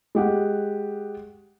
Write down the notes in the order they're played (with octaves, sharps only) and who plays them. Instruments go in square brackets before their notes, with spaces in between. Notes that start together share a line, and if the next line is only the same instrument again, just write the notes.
[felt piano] G#3 G4 F#5